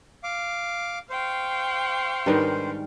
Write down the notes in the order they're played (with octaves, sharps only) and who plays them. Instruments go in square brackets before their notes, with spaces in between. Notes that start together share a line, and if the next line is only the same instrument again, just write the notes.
[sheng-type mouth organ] F5 D6
[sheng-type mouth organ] C5 [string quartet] F5 G5 C#6
[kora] G#2 D#3 G3 [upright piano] D4 A#4 B4